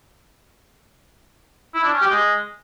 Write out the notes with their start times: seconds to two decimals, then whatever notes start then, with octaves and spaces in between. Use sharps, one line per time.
1.74 E4
1.83 D4
1.92 C#4
2.01 G4
2.10 G#3